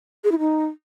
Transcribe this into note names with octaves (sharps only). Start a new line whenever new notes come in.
G#4
E4
D#4